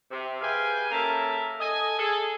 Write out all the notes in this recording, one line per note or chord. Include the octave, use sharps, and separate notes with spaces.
C3
G4 G#4 B4 F5 G5 G#5
A#3 C#4 A4 A#4 E5 A5
A4 D#5 G#5
G#4 A4